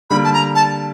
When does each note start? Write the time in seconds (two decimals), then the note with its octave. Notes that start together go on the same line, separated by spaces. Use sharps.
0.10 D3 G3 A#3 B5
0.24 A5
0.33 A#5
0.55 A5